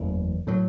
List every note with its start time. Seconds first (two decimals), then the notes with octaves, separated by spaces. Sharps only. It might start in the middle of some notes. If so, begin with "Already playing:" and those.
Already playing: F#1 E2 E3 A3
0.47 A2 F#3